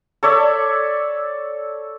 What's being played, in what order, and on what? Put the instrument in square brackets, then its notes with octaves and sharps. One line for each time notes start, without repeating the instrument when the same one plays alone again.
[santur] A4 C#5 D5 E5